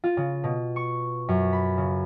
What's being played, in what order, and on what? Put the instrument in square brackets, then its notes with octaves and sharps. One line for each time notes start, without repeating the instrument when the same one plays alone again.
[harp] F4
C#3
B2
C#6
F#2
B5
C#3